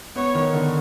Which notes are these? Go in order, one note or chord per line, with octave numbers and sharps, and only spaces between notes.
B3 C#5
D#3
D3